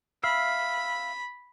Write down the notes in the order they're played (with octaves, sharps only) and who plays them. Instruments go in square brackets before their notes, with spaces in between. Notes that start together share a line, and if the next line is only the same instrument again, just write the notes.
[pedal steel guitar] E5 F5 [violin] B5